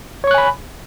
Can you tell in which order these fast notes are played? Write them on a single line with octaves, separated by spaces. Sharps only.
C#5 C#6 F#6 G#5 B5